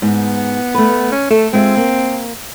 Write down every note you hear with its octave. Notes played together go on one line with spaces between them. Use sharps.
G#2 B3
A3 B4
C#4
A3 A4
G#3 C4 F4 E5
A#3